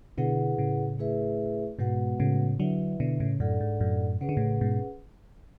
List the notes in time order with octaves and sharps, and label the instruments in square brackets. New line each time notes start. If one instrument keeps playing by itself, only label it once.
[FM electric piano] B2 D3 [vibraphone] E4 G#4 B4 F#5
[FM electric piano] A2 C#3
[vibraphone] A3 E4 G#4 B4 E5
[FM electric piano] G#2 B2 [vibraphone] G#3 B3 F#4 B4 F#5
[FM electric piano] A2 C#3
[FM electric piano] D3 F#3 [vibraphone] E4 B4 E5
[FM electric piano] B2 D3
A2 C#3
[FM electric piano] F#2 A2 [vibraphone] D4 A4 D5 F#5
[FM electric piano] G#2
F#2 A2
[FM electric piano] C#3 [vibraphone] C#4 G#4 B4 F#5
[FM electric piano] D3
A2 C#3
G#2 B2